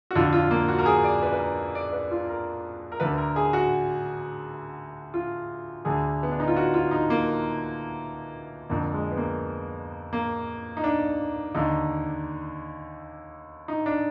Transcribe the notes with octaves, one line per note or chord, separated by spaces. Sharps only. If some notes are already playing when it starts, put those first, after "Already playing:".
F#4
F2 D3 F4
F4
A#3
F#4
A#4
G#4
D5
B4
B4
A#4
D5
B4
F4
A#4
A#4
D2 D3 B4
A#4
G#4
F#4
F4
D2 D3 G#4
B3
D4
D#4
F4
F#4
F4
D#4
A#3
F2 D3 A#3
G#3
B3
A#3
A#3
D#4
D4
D#2 D3 D#4
D#4
D4